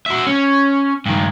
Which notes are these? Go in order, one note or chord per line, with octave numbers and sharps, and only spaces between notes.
F#4 E5
C#4
G2 D#3